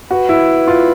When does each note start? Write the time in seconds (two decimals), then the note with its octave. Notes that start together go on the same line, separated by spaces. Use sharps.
0.10 F#4 B4
0.29 E4
0.68 F4